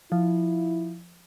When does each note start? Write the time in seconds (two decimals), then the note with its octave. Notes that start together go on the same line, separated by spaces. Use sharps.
0.12 F3 E4